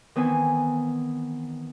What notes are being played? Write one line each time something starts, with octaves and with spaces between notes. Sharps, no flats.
D#3 E3 B3 C4 G#5